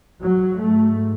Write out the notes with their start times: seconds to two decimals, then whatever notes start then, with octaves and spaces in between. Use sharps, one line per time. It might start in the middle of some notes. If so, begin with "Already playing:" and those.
0.20 G#2 F#3
0.59 A3